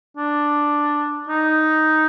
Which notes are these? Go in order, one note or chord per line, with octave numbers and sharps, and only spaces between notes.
D4
D#4